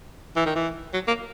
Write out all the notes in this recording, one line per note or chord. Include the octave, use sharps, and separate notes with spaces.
E3
D#3
E3
F#3
A#3